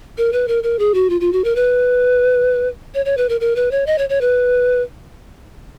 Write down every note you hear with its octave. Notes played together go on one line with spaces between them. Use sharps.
A#4
B4
A#4
A#4
G#4
F#4
F4
F4
F#4
A#4
B4
C#5
C#5
B4
A#4
A#4
B4
C#5
D#5
C#5
C#5
B4